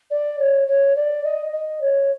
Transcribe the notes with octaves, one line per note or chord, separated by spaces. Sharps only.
D5
C#5
C#5
D5
D#5
D#5
C#5